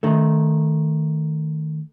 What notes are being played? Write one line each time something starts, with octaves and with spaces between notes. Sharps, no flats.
D#3 A3